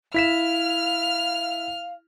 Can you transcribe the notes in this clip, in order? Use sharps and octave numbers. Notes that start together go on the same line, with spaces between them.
E4 F5 F6 B6 E7